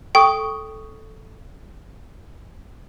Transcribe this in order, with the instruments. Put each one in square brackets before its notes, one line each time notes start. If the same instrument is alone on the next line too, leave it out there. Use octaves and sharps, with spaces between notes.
[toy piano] A4 C#6 D#6 [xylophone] G5